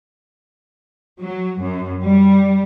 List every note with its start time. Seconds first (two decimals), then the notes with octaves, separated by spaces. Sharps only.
1.22 F#3
1.63 F#2
2.03 G3